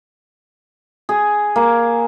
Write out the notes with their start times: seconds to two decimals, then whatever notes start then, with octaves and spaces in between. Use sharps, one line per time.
1.09 G#4
1.56 A#3